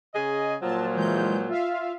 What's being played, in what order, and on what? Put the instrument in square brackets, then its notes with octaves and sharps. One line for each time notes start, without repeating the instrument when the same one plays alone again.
[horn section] C#3 G#4 D#5
[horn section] A#2 F3 F#3 [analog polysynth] A5
[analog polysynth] E3 G#3 G6
F4 E5 F5